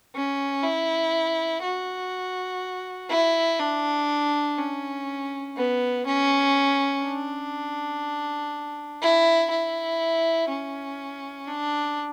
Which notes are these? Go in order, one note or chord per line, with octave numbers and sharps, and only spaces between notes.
C#4
E4
F#4
E4
D4
C#4
B3
C#4
D4
E4
E4
C#4
D4